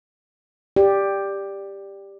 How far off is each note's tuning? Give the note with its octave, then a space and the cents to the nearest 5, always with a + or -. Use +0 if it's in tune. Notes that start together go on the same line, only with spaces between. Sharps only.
G4 +10 D5 +0